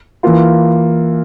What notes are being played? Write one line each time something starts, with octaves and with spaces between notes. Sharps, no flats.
E3 A#3 F4